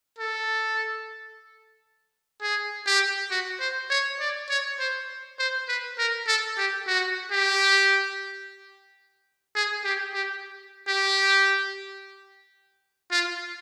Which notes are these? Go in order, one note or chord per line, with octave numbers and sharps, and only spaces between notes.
A4
G#4
G4
F#4
C5
C#5
D5
C#5
C5
C5
B4
A#4
A4
G4
F#4
G4
G#4
G4
G4
G4
F4